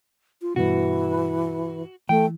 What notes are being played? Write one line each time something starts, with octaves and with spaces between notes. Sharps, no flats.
F4
G2 B2 E3 F#4
E3 A3 G5